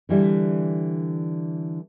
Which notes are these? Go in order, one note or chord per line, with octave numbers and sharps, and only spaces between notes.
D3 E3 G3